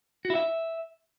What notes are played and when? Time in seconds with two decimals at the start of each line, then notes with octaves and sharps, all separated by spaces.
0.25 F#4
0.30 E4
0.35 E5